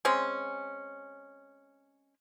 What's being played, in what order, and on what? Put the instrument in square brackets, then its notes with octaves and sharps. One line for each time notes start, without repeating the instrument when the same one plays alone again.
[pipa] G#3 C4 C#4